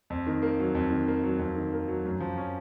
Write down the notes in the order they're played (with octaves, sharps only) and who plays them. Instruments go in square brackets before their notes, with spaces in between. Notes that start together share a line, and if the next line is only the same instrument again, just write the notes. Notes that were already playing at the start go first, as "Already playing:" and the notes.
[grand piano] F2
D#3
A#3
F#3
F2
D#3
A#3
F#3
F2
D#3
A#3
F#3
F#2
F3
C#4